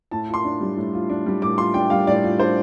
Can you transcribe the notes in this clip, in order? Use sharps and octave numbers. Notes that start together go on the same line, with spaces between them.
A2 A5
F4
C6
D4
G3
A2
F4
D4
G3
A2 D6
F4 C6
D4 G5
G3 F5
A2 D5
F4
D4 C5